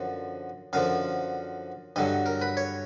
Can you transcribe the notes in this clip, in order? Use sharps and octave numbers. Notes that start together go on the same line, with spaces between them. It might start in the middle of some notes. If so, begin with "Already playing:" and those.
Already playing: F#2 D3 F3
F#2 D3 F3 F5
G2 D3 F#3 D#5
A#4
B4
C#5